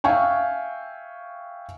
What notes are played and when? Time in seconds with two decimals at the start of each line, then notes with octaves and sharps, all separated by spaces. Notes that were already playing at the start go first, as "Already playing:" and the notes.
0.04 E5 F5 G5 G#5 C#6